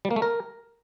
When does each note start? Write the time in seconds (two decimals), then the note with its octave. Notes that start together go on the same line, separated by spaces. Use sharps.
0.05 G3
0.11 A#3
0.16 A3
0.22 A#4